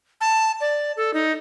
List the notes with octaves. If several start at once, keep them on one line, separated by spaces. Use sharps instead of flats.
A5
D5
A4
D#4